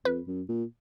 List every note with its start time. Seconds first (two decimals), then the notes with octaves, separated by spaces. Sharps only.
0.05 F2 B4
0.27 F#2
0.49 A#2